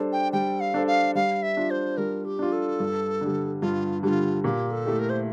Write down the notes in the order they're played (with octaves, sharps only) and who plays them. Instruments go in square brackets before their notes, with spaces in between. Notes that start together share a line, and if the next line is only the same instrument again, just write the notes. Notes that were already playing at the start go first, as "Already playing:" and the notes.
Already playing: [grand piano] G3 D4 A4 C5
[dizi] G5
[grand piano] G3 [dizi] G5
[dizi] F5
[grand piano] D4 A4 C5
[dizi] F5
[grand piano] G3 [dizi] F5
[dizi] E5
[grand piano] D4 F4
[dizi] C5
[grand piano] G3 [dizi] A#4
[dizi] G4
[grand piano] D4 F4
[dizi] A4
[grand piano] G2
D3 G3
[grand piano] G2 [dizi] F4
[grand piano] D3 G3 [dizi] F4 G4
[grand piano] A#2 [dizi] G4
[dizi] A4
[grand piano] A3 E4 G4
[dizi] A#4
C5